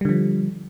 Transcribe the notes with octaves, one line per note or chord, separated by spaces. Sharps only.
D3 F3 G3